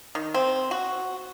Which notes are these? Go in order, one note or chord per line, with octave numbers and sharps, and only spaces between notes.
D#3
C4
F#4